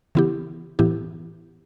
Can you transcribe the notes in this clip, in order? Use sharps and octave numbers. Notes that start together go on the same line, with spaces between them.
C#3 E3 B3 E4 G4
A2 E3 B3 E4 G4